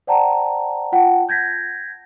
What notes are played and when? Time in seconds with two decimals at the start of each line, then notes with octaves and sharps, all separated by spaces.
0.07 C5 D5 F#5 G5 A5 A#5
0.92 F4 F#5 G5 A5
1.29 G6 G#6 A#6 B6